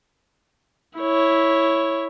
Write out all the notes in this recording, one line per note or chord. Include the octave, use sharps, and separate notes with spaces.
E4 C#5